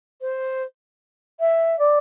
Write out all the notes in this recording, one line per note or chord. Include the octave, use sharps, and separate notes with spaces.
C5
E5
D5